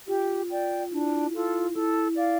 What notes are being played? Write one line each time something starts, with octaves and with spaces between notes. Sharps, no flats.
F4 G4
D5 G5
D4 E4
F4 A4
E4 A4
D5 F5